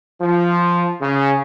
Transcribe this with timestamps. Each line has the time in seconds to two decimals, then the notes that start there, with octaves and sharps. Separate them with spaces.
0.21 F3
1.01 C#3